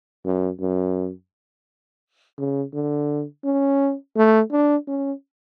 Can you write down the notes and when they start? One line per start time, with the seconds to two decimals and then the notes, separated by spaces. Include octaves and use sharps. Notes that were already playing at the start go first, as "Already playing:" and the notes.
0.25 F#2
0.60 F#2
2.38 C#3
2.73 D3
3.44 C#4
4.16 A3
4.51 D4
4.87 C#4